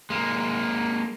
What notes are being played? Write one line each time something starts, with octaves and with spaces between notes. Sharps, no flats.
G#3 A#3